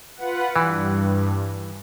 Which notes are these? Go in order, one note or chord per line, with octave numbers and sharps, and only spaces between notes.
F4 B4 F#5
G2 E3